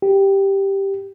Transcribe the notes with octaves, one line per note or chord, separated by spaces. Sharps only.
G4